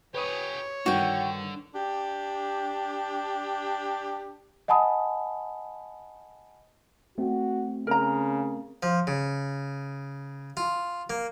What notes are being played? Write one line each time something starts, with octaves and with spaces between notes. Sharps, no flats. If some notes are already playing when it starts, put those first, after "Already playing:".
G4 B4 C#5 G#5 D#6
G2 D3 D#3 F#4 G5
D4 G4
D#5 F#5 G#5 A5 B5 D#6
A3 C4 F#4
C#3 A#4 A#5
F3
C#3
F4
A#3